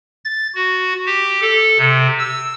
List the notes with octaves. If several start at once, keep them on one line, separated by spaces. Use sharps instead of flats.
A6
F#4
G4
A4
C3
E6